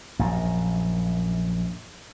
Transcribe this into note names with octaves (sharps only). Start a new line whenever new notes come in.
A#1 F#2